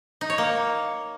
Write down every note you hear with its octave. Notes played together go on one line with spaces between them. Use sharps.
D#4
C#5
A#3